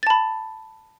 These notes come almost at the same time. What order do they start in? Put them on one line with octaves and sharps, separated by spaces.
A6 A5 B5